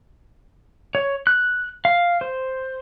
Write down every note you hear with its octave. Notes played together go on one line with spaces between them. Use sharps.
C#5
F#6
F5
C5